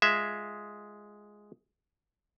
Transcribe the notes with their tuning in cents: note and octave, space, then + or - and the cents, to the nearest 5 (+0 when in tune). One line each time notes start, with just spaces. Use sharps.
G#3 +0 F4 +0 E5 +0